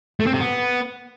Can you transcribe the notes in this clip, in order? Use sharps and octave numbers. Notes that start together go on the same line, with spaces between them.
A3
C4
C3
B3